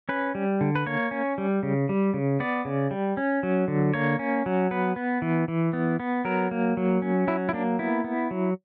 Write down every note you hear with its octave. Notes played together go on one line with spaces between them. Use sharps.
C#4 B4
G3
D3
B4
A#3 C#5
C#4
G3
C#3
G3
C#3
B3 D5
C#3
G3
C#4
F#3
D3
A#3 C#5
C#4
F#3
B3 B4
B3
E3
E3
B3
B3
F#3 A#4
A#3
F#3
C#4
F#3 E4
E4
A#3 D4
B3 E4
B3
F#3